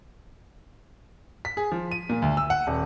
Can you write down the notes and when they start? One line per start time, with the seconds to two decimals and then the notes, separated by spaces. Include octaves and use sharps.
1.45 B6
1.57 G#4
1.72 F3
1.91 D#7
2.09 A#2
2.22 D2
2.37 E6
2.50 F#5
2.67 D#1